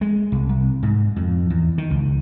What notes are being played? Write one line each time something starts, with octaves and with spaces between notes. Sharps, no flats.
G#3
C2
C2
G#2
F2
E2
D#3
C#2